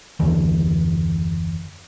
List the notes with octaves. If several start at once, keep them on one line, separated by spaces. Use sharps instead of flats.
F#1 D#2 D3 E3